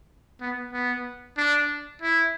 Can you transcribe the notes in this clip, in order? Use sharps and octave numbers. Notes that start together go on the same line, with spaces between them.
B3
B3
D4
E4